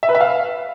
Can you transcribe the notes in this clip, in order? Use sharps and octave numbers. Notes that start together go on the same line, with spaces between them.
E5
B4
E5
F5